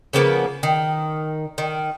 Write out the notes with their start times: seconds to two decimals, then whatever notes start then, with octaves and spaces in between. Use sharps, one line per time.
0.13 C#3 F3 A#3 B3
0.63 D#3
1.58 D#3